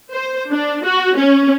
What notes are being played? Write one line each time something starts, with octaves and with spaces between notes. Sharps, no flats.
C5
D4
F#4
C#4